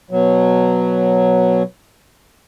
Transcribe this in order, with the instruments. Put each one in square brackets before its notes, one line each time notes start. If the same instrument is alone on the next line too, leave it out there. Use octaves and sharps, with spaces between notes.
[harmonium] B2 F#3